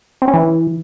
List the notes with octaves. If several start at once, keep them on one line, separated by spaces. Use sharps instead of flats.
C4
C#4
E3